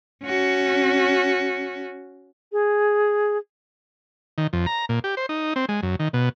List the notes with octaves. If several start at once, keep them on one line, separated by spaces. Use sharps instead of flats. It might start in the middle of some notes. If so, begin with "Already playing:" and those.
C#4 F#4
G#4
D#3
F2
A#5
A#2
G4
C5
D#4
C4
G#3
F#2
D#3
B2